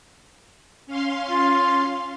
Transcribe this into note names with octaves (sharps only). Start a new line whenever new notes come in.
C#4 F5 C6
F4